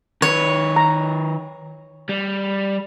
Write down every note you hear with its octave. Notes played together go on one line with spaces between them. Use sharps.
D#3 B4 C#5
A#5
G3